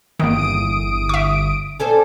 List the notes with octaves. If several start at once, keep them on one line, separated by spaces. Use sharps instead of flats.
G1 E2 D#3 A#3 D#6 D7
E5 C#6
C#4 A4 C5 D5